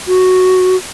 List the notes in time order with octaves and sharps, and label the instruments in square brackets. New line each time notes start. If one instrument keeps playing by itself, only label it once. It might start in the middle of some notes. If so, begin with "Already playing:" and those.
[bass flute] F#4